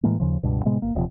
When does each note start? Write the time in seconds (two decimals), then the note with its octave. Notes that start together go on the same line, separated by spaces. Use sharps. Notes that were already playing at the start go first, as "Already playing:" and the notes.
0.03 A2 E3 G#3 A#3
0.20 D#2 C#3 F3
0.43 C#2 G2 B2
0.65 A2 C3 G#3 B3
0.82 G1 A#3
0.95 D#1 C3 F3